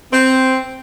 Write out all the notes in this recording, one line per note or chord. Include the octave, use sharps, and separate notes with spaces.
C4